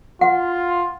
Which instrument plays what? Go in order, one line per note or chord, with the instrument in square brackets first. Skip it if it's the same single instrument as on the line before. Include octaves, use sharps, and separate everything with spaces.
[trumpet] F4 [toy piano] F#5